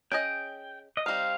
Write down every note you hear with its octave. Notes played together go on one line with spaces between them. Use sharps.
C#4 G#4 D#5 G5
D#5
G3 C4 D#4 F5